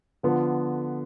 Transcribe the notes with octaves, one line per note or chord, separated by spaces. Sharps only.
D3 F3 B3 F4